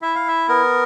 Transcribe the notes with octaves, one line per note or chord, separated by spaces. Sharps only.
E4 E5
F5
E5
B3 A#4